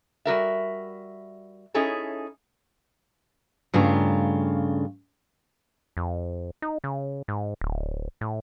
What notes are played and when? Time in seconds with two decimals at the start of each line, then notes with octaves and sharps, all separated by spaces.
0.25 G3 F#4 A#4 E5
1.74 C#4 D#4 E4 G#4 A4 C#5
3.74 G2 C#3 A3 F4 A#5
5.97 F2
6.62 D#4
6.84 C#3
7.28 G#2
7.61 D1
8.21 A2